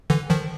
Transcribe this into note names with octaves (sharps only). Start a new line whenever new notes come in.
D3 E3
D#3 F3